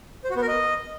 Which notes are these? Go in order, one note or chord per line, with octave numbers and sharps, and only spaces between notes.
C5
F#4
B3
A#4
D#5